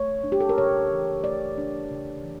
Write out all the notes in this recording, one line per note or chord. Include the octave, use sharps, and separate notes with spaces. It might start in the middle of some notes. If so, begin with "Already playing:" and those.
Already playing: A3 C#5
D4
G4
A4
A#4
C#3 C#5
E3
A3 D5
D4
C#3
E3